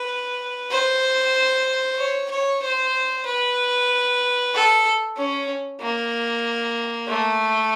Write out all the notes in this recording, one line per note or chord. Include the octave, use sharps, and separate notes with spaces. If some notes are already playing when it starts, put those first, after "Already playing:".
Already playing: B4
C5
C#5
C#5
C5
B4
A4
C#4
A#3
A3